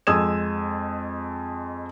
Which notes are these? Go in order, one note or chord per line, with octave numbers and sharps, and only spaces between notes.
F2 G#3 D#6 E6 G#6 E7